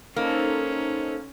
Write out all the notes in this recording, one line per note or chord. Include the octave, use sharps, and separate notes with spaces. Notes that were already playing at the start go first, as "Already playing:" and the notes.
A#3 C#4 D#4 A4 C5